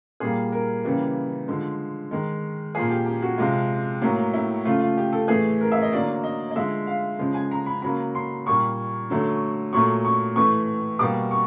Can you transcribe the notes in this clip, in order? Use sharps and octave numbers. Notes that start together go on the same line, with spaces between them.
A#2 G3 A#3 G#4
A#4
C#3 E3 G3 A#3
D3 F3 G#3
D#3 G#3
A#2 F3 A#3 G#4
G4
G4
F#4
C3 F3 G#3 F4
A2 F#3 A#3
E4
C#3 F3 A3 F4
F4
G4
A4
A2 E3 A3 G#4
A#4
E5
D#5
D3 F#3 A#3 D5
D#5
D#5
D3 F3 G#3 E5
F5
C#3 F3 G#3
G#5
A#5
B5
C#3 F#3 A#3 B5
C6
A#2 G3 A#3 C#6
D3 F#3 A3
A#2 F#3 A3 C#6
C#6
A2 E3 A3 C#6
B2 G3 A#3 D6
C#6